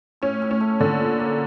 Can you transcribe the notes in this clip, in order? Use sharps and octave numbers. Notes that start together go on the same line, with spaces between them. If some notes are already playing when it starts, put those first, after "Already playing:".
A2 C#4
A2
C#4
A3
A#2 D3
A#2
A#3